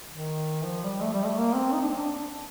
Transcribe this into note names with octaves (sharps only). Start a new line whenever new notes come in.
D#3
F3
G3
A3
G3
A3
A#3
C4
D#4
D4
C4
D4